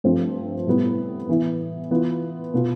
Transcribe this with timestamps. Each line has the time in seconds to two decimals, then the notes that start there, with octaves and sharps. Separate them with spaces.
0.04 G2 F3 A3 C4
0.66 A2 G3 B3
1.29 E3 B3 E4
1.91 E3 B3 F4
2.54 B2 B3 F4